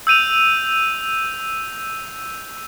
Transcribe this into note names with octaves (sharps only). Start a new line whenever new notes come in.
E6 G6 D#7 F7